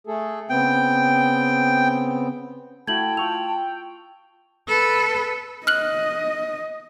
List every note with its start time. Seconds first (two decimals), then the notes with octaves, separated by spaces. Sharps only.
0.07 A3 G#4 A4
0.50 C#3 B3 C4 G5
2.87 A3 E4 F#4 G5 A5 G#6 F#7
3.17 F4 C#6 E6 F7
4.68 A4 B4
5.67 D#5 F6 F#6 F#7